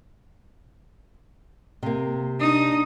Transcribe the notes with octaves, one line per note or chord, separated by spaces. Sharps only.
C3 A#3
D4 D#4 D#6